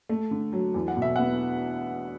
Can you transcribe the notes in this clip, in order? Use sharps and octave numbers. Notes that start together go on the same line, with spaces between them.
A3
D3
F#3
E2
F#5
B2
E5
B3 F#5